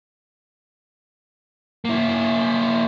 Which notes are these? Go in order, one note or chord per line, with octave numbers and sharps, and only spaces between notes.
A#3 E4